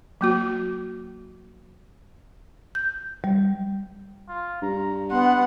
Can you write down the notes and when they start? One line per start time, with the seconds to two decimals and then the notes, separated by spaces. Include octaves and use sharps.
0.21 F#3 A#3 F#4
2.75 G6
3.24 G3
4.29 F4
4.62 G2 A#5
5.11 B3 F#5 C6